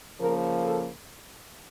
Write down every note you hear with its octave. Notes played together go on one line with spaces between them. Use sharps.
C#3 F3 A#3 A#4
A4